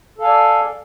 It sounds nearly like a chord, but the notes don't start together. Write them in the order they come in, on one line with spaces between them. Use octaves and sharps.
A4 F5 G#5 D5